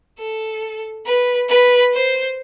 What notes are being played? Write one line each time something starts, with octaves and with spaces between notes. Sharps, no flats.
A4
B4
B4
C5